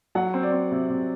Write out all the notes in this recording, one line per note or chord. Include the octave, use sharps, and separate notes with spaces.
F#3 F#5
C4
D5
C4
C3
C3